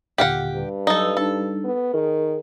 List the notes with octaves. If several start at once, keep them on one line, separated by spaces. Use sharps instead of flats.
D#2 A#2 D3 G4 F5 F#5
G2
F#3 D#4 A4 B4 E6
G3 D4 D#4 A4
B3
D#3 G#4 A#4